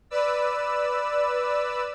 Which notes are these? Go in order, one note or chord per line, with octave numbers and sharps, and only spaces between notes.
B4 D5 E6